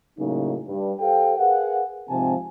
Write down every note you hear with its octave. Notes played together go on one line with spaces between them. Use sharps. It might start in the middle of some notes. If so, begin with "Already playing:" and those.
A2 C#3 F#3 A#3 D#4
G2
G4 A4 C5 F5 G5
G#4 A#4 B4 F5 F#5
G#2 C3 F3 C4 G#5 A5